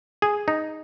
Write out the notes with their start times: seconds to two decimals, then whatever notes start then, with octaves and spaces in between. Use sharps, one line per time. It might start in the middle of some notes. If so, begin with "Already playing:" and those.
0.22 G#4
0.48 D#4